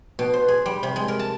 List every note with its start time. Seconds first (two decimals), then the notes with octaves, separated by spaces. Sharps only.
0.19 B2
0.34 C5
0.48 G#4
0.66 G3
0.83 C3
0.96 G#3
1.08 A#4
1.19 A5